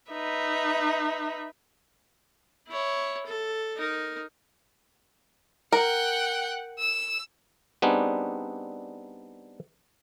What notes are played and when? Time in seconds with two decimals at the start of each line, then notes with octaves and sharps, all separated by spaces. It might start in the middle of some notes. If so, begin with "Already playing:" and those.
0.12 D#4 B4 E5
2.68 E4 C#5
3.27 A4
3.76 D#4 A#4
5.72 A#4 F#5 G5
6.79 E6
7.82 G3 B3 C4 D4 D#4 G#4